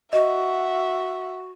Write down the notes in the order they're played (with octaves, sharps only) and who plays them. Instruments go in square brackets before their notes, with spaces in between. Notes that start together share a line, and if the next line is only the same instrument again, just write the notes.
[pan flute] F#4 [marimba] D#5 [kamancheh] E5 F#5